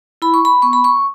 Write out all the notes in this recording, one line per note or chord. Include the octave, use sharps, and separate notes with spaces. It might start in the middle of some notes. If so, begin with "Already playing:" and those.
E4 B5
C#6
B5
B3 C#6
B5
C#6